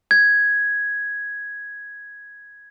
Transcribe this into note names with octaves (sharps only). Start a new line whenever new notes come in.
G#6